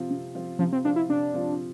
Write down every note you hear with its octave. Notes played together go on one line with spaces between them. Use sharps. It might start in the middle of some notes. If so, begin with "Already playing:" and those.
Already playing: C3 F3 C4 F4
C3
F3 C4 F4
C3 F3
C4
F3 C4 D4 F4
E4
C3 D4
F3 C4 F4